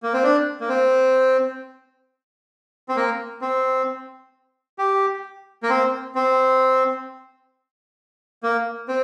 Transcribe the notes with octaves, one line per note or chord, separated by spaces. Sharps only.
A#3
C4
D4
A#3
C4
C4
A#3
C4
G4
A#3
C4
C4
A#3
C4